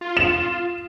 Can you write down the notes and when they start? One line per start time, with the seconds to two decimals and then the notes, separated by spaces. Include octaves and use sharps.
0.01 F4
0.17 E7